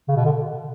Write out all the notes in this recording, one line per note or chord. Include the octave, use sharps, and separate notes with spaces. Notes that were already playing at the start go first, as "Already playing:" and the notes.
C#3
B2
D3